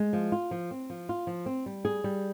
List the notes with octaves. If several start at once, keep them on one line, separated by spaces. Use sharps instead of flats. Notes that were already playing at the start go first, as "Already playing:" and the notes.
Already playing: G#3
F3
F4
F3
C4
F3
F4
F3
C4
G3
G#4
G3